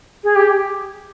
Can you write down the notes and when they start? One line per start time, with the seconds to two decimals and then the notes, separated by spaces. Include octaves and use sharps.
0.24 G#4
0.35 G4